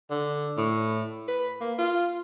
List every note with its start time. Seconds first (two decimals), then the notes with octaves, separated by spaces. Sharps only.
0.10 D3
0.57 A2
1.28 B4
1.61 A#3
1.79 F4